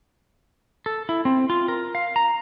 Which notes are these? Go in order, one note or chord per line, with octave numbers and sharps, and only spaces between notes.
A4
E4
C4
F4
A#4
F5
A#5